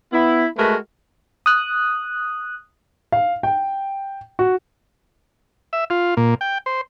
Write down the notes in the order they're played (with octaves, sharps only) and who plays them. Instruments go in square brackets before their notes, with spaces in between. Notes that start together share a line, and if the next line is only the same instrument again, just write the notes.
[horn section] B3 E4
G#3 A3 F#4 A#4 B4
[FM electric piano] D#6 F#6
[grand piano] F5
G5
F#4
[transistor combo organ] E5
F4
A#2
G5
C5